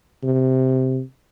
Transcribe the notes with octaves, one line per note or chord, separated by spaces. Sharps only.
C3